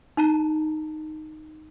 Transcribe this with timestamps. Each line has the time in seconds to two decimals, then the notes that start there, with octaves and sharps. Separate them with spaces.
0.17 D#4 A5 A#5